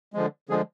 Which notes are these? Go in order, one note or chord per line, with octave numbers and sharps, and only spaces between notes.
D3 F3 G#3
D3 F3 G#3 G#4